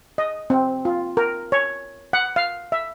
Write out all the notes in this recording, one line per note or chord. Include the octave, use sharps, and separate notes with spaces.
D#5
C4
F4
A#4
C#5
F#5
F5
E5